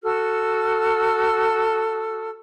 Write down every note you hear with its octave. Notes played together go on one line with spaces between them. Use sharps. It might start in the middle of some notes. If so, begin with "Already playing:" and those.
F#4 A4 E6 F6